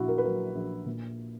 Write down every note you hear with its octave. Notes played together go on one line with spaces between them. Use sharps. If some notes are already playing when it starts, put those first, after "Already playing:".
Already playing: A#1 A#2 E4 F#4
A#4
B4
F#3 A#4
A#1
A#2